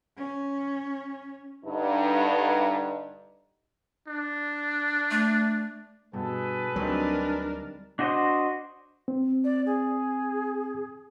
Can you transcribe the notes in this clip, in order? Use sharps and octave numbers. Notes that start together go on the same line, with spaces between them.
C#4
G2 D3 D#4
D4
A3
G2 B2 G#4 A4 B4
D2 F#3 G3 C4 D4 D#4 A#4
D4 F#4 C5 D#5
C4
D5
G#4